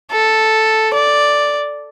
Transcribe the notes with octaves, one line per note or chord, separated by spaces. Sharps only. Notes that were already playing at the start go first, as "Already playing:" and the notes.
A4
D5